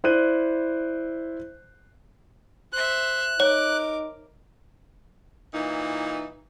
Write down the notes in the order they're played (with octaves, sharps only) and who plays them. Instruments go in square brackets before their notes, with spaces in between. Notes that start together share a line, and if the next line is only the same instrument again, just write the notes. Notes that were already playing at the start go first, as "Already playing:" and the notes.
[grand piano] E4 C5 D5 F#6 G6 D#7
[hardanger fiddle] C5 E5 [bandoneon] F#6
[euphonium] D#4 [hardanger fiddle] A#4 D6 [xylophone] C#5
[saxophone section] A#2 E3 D#4